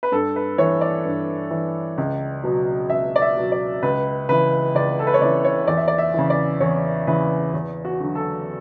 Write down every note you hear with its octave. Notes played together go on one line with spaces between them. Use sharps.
B4
G2 A4
B4
E3 C#5
D5
G2
E3
C#2
B2 F#3
C#2 E5
D5
E5
B2 F#3
D5
C#2 B4
C#3 E3 B4
C#2 D5
A4
B4
C#5
C#3 E3 D5
C#5
E2 D5
E5
D5
E5
C#3 E3
D5
E2 C#5
C#3 E3 B4
E2
F#4
D3 F#3
A4